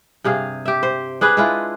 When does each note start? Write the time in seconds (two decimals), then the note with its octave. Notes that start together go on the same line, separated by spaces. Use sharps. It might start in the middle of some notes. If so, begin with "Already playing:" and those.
0.24 G2 C3 G#4 F5
0.65 G4 E5
0.83 C5
1.21 D4 G#4 B4
1.37 G#3 E4 F4